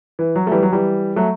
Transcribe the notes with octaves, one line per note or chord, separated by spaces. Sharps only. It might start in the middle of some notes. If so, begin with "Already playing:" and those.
E3
F#3
A3
E3 G3
F#3
E3 G3
F#3 A3